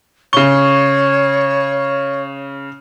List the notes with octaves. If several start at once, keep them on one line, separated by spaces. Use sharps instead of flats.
C#3 C#5 C#6 G7